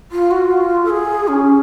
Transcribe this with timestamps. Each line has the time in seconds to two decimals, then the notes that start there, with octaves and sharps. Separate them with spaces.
0.12 F4
0.31 F#4
0.51 F4
0.85 A4
0.90 G#4
1.28 C#4